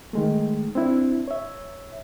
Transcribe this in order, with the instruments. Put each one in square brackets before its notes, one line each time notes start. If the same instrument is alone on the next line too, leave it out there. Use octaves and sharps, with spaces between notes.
[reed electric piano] D#3 G#3 A3
C4 D4 E4
C#5 E5